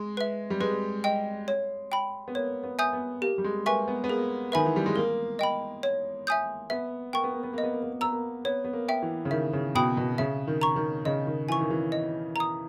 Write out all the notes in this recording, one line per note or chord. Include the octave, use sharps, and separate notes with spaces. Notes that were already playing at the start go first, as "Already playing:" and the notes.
Already playing: G#3
B4 E5
G3
G#3 B4
D#5 G5
C#5
G5 B5
B3
A#3 C#5
B3
E5 G#5 D#6 G6
B3
A#3 G4
G3
G#3
A#3 B4 E5 G#5 C#6
B3
B3
A#3 G#4
D#3 B4 E5 G#5 B5
E3
G3
G#3
A#3 A#4
D#5 G5 B5
C#5
E5 G#5 D#6 G6
B3 E5
A#3 G5 C#6
B3
A#3
B3
A#3 D#5
B3
A#3
B3
A#3
B3 A#5 E6
A#3
B3 C#5
B3
A#3
E5 G5
E3
C#3
D#3 E5
C#3
B2 G5 B5 D#6
B2
C#3 E5
D#3
A#5 C#6
D#3
C#3 D#5
D#3
E3 G#5 C#6
D#3
E3
D#5
A#5 D#6